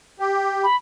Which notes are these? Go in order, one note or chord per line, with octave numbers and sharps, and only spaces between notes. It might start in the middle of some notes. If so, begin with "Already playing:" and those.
G4
B5